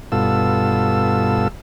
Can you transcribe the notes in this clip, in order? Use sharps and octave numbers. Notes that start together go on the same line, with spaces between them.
G2 B2 F4 A4 E6